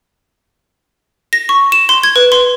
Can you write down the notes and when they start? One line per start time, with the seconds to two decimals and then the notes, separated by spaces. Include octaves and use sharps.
1.33 A#6
1.49 C#6
1.72 E7
1.89 C6
2.03 G#6
2.16 B4
2.32 C6